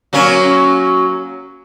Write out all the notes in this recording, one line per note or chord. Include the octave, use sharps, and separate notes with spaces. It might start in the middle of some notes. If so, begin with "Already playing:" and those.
F#3 A#3 C#4